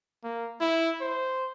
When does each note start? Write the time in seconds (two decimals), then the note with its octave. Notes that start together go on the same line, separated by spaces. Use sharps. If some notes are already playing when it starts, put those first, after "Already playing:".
0.24 A#3
0.61 E4
1.01 C5